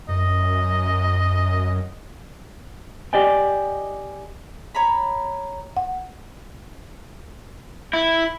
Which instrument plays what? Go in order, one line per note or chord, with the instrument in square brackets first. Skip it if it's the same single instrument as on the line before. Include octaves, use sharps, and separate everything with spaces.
[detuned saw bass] F#2 [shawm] D#5
[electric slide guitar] G4 D5 D#5 G5 G#5
[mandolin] C#5 A#5 B5
[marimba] F#5
[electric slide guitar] E4